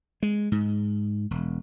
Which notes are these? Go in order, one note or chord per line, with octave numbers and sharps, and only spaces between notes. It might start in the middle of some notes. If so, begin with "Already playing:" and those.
G#3
G#2
E1